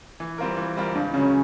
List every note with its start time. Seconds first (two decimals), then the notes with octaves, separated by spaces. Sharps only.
0.20 E3
0.38 G3 C4 F4 A#4
0.57 E3
0.77 G3 C4 F4 A#4
0.95 C#2 D4
1.14 C#3 F#3 C#4